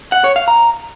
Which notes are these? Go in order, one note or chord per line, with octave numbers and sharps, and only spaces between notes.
F#5
C#5
F5
A#5